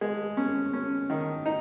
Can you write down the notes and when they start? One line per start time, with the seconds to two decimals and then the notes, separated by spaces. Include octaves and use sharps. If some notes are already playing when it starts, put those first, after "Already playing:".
0.01 G#3
0.37 C#4
0.73 C#4
1.10 D#3
1.46 D#4